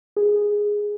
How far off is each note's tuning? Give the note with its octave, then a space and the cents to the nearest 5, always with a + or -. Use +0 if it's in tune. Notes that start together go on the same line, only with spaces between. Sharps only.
G#4 -5